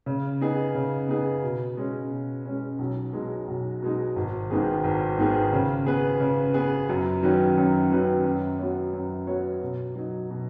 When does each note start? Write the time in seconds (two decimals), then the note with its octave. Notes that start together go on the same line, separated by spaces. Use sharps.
0.06 C#3
0.41 B3 D#4 G#4
0.75 C#3
1.09 B3 D#4 G#4
1.43 B2
1.77 G#3 C#4
2.11 B2
2.46 G#3 C#4
2.79 B1
3.13 B2 G#3 D#4
3.48 B1
3.82 B2 G#3 D#4
4.16 G#1
4.51 G#2 D#3 B3 G#4
4.84 G#1
5.18 G#2 D#3 B3 G#4
5.53 C#3
5.86 B3 G#4 B4
6.20 C#3
6.54 B3 G#4 B4
6.89 F#2
7.23 D#3 F#3 C#4 B4
7.57 F#2
7.91 D#3 F#3 C#4 B4
8.25 F#2
8.59 F#3 B3 F#4 C#5
8.94 F#2
9.27 F#3 B3 F#4 C#5
9.62 B2
9.95 F#3 D#4
10.30 B2